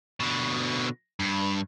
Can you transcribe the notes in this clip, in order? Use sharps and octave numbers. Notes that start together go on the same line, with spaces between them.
B2 D3
G2